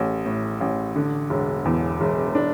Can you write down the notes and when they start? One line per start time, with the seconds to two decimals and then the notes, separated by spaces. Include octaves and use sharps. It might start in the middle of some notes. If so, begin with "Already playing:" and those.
Already playing: A1 A3
0.26 A2
0.61 A1
0.96 D3
1.30 E1
1.65 E2
2.01 E1
2.35 D4